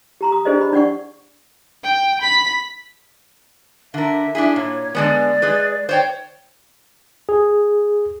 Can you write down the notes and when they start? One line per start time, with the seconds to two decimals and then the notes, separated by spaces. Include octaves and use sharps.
0.21 G4 A#5 C6
0.32 D#6
0.45 D4 G4 G#4 C5 D5 D#5
0.61 B5
0.73 D4 D5 F#5 C#6
1.84 G5
2.22 B5 B6
3.94 D3 A#4 E5
4.35 D4 E4 G#4
4.56 A#2 C#5
4.95 D3 G#3 B3 D5
5.42 G#3 G#4 B4
5.89 C5 C#5 G5
7.29 G#4